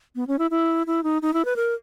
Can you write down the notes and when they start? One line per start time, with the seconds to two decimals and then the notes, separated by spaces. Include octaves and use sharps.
0.16 B3
0.27 C#4
0.39 E4
0.51 E4
0.87 E4
1.03 D#4
1.22 D#4
1.34 E4
1.45 B4
1.56 A#4